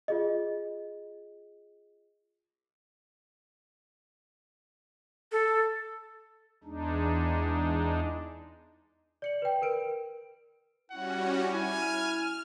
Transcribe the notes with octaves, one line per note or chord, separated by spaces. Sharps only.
F4 G#4 D#5
A4
E2 G#3 D4 D#4
D5 C#7 F#7
B4 G5
A#4 B4 D7
G3 C#4 E4 F#4 F#5
E4 G#5 F6